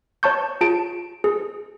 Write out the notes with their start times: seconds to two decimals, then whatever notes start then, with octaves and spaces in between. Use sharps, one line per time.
0.23 C#5 A5 C#6 G6
0.61 F4 G#4 A5 D7
1.24 G#4